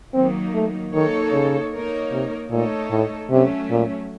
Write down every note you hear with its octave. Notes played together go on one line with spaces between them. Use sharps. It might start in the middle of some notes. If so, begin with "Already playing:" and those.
D#3 F#3 A#3 C4 D#4
A3
D#3 A#3 D#4 A4 C#5
C#3
A#3 D#4 A#4 C#5
C3
A#2 A3 D#4 A4 C#5
A2
C3 F#3 A3 C#4
A#2